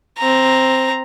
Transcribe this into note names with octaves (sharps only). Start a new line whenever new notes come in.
C4 A#5